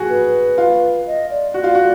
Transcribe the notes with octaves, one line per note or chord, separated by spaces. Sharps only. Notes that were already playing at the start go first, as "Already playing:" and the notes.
Already playing: F#4 G#4
B4
F4
D#5
D5
F#4
F4
F#4